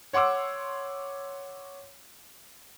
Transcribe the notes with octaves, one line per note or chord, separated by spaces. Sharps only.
C#5 F#5 C6 D6 E6